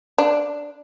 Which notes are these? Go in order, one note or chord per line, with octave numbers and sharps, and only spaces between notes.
D4